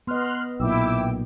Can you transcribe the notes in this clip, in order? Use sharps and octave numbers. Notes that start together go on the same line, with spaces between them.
B3 D#5 C6 F6 F#6
B1 A#2 E4 G5 D6 E6